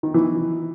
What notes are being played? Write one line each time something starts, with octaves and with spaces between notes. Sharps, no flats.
D#3
E3